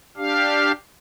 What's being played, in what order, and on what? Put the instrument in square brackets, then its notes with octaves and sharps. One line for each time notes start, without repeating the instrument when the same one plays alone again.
[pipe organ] D4 G4 F5